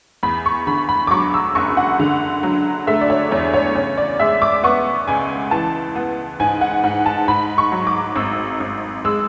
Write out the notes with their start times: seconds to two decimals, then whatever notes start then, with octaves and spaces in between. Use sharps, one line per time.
0.23 E2 B5
0.46 C#6
0.67 D3 B5
0.89 B5
1.07 D6
1.11 F#3 C#6
1.34 E6
1.55 F#1 C#6
1.77 F#5
1.99 D3
2.43 F#3
2.87 A3 E5
3.01 D5
3.10 C#5
3.31 E2 C#5
3.54 C#5
3.75 C#3 C#5
3.98 D5
4.20 G#3 E5
4.42 D6
4.64 B3 C#6
5.08 C#2 G#5
5.51 E3 A5
5.96 B3
6.40 G#2 G#5
6.61 F#5
6.84 G#2 F#5
7.06 A5
7.28 G#2 B5
7.58 C#6
7.72 F#3
7.87 D6
8.16 G#1 E6
8.60 G#1
9.05 G#3 E6